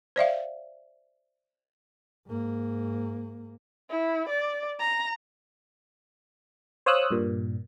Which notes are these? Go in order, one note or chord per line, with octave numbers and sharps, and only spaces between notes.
C5 D5 E5 F5
G#2 A#3
E4
D5
A#5
C5 C#5 F5 D#6 E6 F#6
G2 A#2